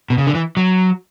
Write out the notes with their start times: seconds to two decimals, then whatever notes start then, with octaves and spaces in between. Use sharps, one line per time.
0.10 B2
0.18 C#3
0.27 D3
0.35 E3
0.57 F#3